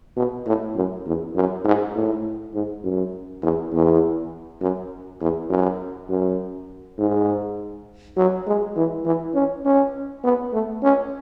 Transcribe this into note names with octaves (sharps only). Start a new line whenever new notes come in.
B2
A2
F#2
E2
F#2
G#2
A2
G#2
F#2
E2
E2
F#2
E2
F#2
F#2
G#2
F#3
G#3
E3
E3
C#4
C#4
B3
A3
C#4